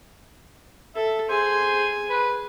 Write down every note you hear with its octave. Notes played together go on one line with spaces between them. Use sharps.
A4 E5
G#4 C5 G#5
B4